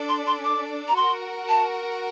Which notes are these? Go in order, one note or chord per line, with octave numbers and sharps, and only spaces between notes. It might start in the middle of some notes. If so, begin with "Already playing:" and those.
Already playing: D4 A4 D5
C6
C6
D6
A#5
F#4 A#4 F#5 C6
A5